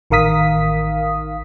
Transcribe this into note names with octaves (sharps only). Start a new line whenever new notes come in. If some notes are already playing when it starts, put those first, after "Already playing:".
A1 D#3 A#4 F5 D#6 B6